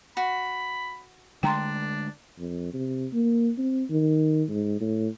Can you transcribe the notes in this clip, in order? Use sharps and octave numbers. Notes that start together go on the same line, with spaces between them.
F#4 B5
D3 G#3 A3 D4 G5 A#5 C6
F2
C3
A#3
C4
D#3
G#2
A2